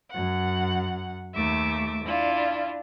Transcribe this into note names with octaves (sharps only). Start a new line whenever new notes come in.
F#2 F#5
D#2 A3 E5 D6
D4 E4 F4